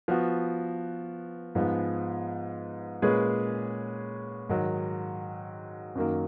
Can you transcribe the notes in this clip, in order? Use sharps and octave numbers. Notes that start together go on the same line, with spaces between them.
F3 B3 F#4
G#2 F3 G#3 B3
A#2 G#3 C#4 G#4 B4
G#2 D#3 F#3
F#2 D#3 F#3 A#3